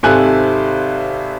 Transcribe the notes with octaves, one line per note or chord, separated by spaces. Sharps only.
G#1 C3 A4 G#5 F#6